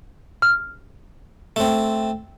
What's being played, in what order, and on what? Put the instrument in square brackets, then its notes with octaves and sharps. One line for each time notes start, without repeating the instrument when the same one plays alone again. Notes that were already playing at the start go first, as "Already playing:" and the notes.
[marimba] F6
[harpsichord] A3 C4